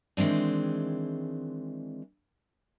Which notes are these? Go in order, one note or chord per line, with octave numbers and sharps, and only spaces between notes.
D#3 E3 G#3 C4 D4